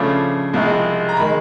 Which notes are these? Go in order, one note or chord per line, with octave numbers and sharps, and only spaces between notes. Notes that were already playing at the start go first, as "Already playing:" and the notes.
Already playing: C#3 F3 A3 D4 B5
C2 C3 F3 G#3
A#5
D#3 G#3 B5